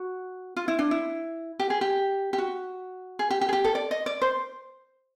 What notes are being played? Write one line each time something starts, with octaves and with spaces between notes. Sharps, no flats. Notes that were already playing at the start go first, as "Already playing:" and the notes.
Already playing: F#4
F4
E4
D4
E4
G4
G#4
G4
G4
F#4
G#4
G4
G4
G#4
G4
A4
D5
D#5
D5
C5